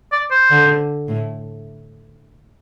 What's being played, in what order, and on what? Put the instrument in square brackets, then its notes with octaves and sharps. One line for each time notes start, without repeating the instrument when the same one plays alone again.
[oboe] D5
C5
[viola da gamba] D3
A2